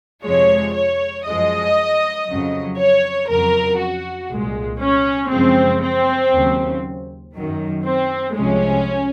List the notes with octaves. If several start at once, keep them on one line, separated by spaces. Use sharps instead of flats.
F2 C3 F3 G#3 C#5
C#5
F#2 F3 G#3 D#5
F2 C#3 F#3
C#5
F2 C#3 F#3 A#4
F#4
C2 A#2 G#3
C#4
F#2 C#3 F3 G#3 C4
C4
D#2 C#3 F#3
F#2 D#3 F#3
C4
C2 C3 F3 G#3 C#4